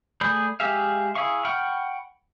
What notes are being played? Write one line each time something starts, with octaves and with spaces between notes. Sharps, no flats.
A3 G#4 D5 B5 G6
G#3 G4 G#4 E5 F5
E4 G#4 E5 F5 C#6
F#5 G5 B5 C#6 F6